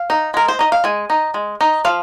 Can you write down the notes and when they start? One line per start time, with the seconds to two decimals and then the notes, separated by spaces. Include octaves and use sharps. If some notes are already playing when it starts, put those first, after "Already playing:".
Already playing: F5
0.10 D#4
0.34 G#3 A#4
0.48 C5
0.59 D#4 D#5
0.72 F5
0.84 G#3 G#5
1.10 D#4
1.34 G#3
1.61 D#4
1.85 F3 F5